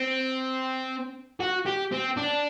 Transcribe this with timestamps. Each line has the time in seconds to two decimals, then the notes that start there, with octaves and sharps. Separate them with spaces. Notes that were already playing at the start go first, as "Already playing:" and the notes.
Already playing: C4
1.40 F#4
1.66 G4
1.92 C4
2.17 D4